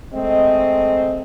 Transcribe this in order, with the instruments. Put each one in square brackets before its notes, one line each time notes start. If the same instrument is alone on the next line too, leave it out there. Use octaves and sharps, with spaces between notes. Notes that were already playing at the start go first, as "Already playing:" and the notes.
[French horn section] G#3 A3 C4 D#5